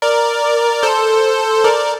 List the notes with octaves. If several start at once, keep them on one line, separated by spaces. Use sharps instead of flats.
A#4 D5
A4 C5
A#4 D5